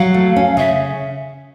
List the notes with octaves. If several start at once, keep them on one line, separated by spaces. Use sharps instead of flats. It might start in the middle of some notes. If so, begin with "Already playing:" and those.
Already playing: F#3 F5
A3
C#4
C#3 E5